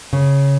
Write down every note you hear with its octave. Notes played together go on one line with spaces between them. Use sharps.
C#3